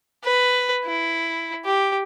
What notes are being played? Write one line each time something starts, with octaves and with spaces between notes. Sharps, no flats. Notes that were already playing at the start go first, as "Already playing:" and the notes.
B4
E4
G4